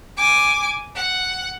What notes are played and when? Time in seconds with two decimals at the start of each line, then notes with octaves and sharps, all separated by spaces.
0.17 G#5 D6
0.95 F#5